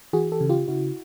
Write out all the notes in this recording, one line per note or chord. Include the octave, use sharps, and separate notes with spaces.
E3 F#4 G#4
G4 A4
C#3
F4 G4
C#3 E4 F#4